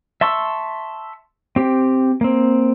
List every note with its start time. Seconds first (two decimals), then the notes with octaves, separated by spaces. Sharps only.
0.21 E5 A5 C6 C#6 E6
1.56 C4 G4
2.21 A#3 C4